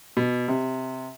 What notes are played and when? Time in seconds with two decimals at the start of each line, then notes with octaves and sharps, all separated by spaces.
0.17 B2
0.48 C3